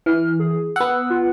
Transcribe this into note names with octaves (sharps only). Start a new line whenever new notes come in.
E3 F6
G#4
B3 F#5 E6
F4